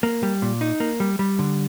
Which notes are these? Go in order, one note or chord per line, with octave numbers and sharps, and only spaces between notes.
A#3
G3
A#2
D#4
A#3
G3
G3
D3